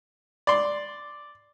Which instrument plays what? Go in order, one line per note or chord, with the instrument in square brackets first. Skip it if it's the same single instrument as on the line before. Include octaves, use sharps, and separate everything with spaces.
[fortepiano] D5 C6